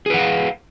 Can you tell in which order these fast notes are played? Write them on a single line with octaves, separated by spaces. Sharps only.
G#4 B4 F#5 F5